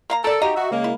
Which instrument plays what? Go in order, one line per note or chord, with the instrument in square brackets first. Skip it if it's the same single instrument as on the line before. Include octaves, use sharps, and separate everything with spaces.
[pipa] A#3 F5 A#5
[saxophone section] A4 [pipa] A#4 D5
[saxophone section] D#4 F#4 G4 [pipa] D#5 F5 A#5
[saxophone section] F#4 E5
C#3 G#3 A#3
[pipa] E4